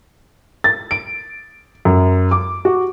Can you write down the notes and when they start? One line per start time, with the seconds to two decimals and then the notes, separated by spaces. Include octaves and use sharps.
0.64 A6
0.91 D7
1.85 F#2
2.31 D6
2.65 F#4